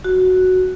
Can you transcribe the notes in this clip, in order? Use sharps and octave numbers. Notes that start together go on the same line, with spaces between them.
F#4